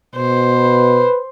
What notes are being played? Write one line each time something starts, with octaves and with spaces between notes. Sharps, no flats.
B2 C5
B4